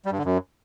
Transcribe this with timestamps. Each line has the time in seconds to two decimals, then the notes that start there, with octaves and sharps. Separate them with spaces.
0.05 G3
0.12 G2
0.18 D3
0.25 F#2